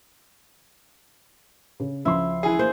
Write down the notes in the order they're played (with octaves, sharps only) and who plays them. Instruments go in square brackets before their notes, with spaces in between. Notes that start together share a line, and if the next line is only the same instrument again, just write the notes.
[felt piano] C#3
[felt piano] C#2 F3 C6 [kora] E4
[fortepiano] E3 G#4
[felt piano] A#3 E4 [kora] C5